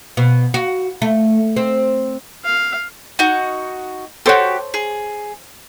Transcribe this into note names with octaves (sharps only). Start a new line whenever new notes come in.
B2
F#4
A3
C4
F5
D#4 F#4
F#4 G4 A4 C5 C#5
G#4